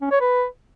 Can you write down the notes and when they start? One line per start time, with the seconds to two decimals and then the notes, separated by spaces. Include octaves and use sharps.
0.01 C#4
0.11 C#5
0.21 B4